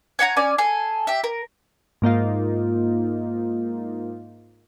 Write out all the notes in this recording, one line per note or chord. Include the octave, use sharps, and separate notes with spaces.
C#5 F#5 G#5 A#5
C#4 D5 G#5
G#4 A4 G#5
G4 E5
A#4
G#2 A#3 D#4 F4